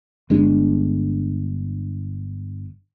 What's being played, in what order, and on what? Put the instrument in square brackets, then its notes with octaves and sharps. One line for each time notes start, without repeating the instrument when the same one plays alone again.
[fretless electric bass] G1 G#3 D4